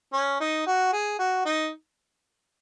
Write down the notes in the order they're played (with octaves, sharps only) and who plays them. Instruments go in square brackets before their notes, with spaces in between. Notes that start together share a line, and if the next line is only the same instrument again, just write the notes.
[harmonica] C#4
D#4
F#4
G#4
F#4
D#4